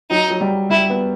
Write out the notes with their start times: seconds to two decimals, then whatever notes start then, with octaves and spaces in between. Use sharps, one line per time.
0.10 F#3 D#4
0.31 F#3
0.41 G3
0.70 G3 E4
0.90 B3